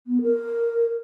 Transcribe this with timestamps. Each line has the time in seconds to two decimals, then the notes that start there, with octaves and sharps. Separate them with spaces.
0.06 B3
0.22 A#4